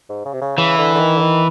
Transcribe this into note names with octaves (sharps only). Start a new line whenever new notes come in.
G#2
C#3
C3
C#3
C#3 E3
D3
D3
D#3
D3
D#3